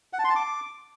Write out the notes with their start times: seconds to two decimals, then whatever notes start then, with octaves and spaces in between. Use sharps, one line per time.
0.13 F#5
0.19 A5
0.24 C6
0.30 A5
0.36 D6